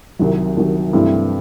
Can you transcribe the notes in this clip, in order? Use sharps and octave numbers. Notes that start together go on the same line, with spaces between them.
C2 C3 D#3 F#3
C2 C3 D#3 F#3
G2 E3 A3 C4 E4